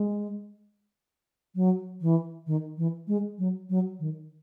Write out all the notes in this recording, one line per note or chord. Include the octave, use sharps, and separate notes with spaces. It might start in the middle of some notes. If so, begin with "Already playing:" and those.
Already playing: G#3
F#3
E3
D#3
E3
G#3
F#3
F#3
D#3